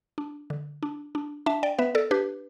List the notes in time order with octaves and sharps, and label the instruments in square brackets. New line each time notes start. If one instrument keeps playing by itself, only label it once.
[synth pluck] D4
D3
D4
D4
D4 E5 A5
D5 G5
B3 B4 E5
A4 D5
D4 G4 B4